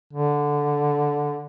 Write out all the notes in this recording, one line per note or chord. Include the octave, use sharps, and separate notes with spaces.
D3